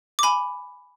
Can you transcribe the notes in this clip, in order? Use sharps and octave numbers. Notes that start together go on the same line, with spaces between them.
D6
G#5 B5